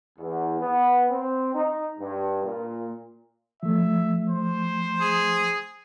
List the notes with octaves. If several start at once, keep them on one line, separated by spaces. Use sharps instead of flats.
E2
B3
C4
D#4
G2
A#2
F3 A3 E5
C5
G#4